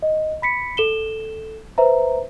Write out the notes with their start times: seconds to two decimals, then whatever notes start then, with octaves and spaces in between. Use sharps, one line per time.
0.02 D#5
0.42 B5 B6 C#7
0.77 A4 E7 G7
1.78 B4 C5 E5 A#5